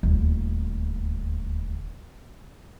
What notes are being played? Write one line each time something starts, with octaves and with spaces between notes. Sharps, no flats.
D#1 D2